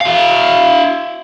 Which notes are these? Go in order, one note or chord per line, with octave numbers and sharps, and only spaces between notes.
E4 F5